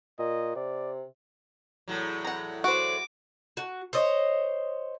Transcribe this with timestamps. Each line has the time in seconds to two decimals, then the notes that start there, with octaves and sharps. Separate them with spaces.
0.19 A#2 D#5
0.56 C3 D5
1.88 E2 A2 F#3
2.24 F#5 A#5
2.64 F#4 C5 D5 D6
3.57 F#4
3.93 C5 C#5 D#5